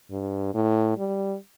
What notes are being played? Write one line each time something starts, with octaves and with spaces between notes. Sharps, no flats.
G2
A2
G3